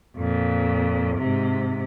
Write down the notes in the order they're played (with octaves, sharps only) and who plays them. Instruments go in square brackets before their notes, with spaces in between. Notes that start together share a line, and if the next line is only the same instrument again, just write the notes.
[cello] F2 A#2
G#2 C3